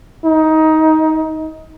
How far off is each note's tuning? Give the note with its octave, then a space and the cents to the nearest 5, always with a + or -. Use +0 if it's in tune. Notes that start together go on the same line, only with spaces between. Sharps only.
D#4 +20